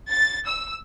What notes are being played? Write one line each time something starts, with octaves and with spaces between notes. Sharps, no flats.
A6
E6